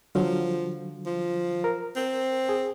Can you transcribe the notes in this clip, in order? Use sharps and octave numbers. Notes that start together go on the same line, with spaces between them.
D3 F3 F#3
F3
A#4
C4
G#4